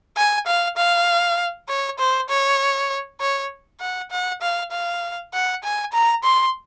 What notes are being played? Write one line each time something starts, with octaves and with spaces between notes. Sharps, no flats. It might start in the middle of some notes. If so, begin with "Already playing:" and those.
G#5
F5
F5
C#5
C5
C#5
C#5
F#5
F#5
F5
F5
F#5
G#5
A#5
C6